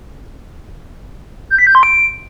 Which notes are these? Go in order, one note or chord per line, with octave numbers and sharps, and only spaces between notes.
G6
B6
G6
C6
D7